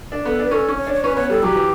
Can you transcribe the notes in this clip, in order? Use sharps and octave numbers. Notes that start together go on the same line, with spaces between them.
D4
B3 A4
D4
B4
C#4 A4
C#4
C#5
D4
C#5
C#4 B4
B3 C#5
G3 A4
F#3 G4
E3